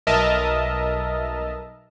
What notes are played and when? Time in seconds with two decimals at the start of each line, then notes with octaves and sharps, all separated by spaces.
0.07 B1 A#4 D#5 E5 A5 F6